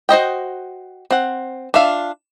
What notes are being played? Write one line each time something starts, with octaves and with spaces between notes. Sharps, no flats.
F#4 C5 D#5 G5
C4 F#5
D4 F4 E5 F5